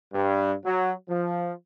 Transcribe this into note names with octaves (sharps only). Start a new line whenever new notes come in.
G2
F#3
F3